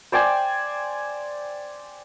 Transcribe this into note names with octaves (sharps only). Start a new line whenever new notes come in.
C5 D5 G5 G#5